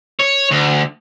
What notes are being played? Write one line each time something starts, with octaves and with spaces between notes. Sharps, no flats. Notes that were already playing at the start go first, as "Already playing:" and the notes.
C#5
D2